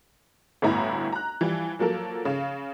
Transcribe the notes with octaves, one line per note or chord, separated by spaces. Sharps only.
G1 D2 A2 B3 E4 A#5
A#5 F#6
E3 F3 G3
F3 F#3 A#3 A4 A#4
C#3 F5